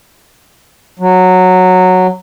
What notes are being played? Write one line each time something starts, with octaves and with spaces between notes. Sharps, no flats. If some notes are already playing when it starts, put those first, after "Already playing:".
F#3